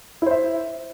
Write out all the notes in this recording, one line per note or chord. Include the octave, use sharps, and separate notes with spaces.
E4 C5 E5